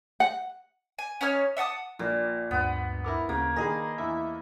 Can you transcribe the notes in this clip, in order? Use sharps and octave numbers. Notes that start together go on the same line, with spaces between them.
F#5
G#5
C#4 D#4 C#5 F6
E5 F#5 A5 D#6
A#1 A#2 A#3
D2 G2 B3 F#5
E4 A#4 D6
D2 C#3 A#3
D#3 D#4 G#4 D#5 G#5 A#5 B5
E2 E4 E5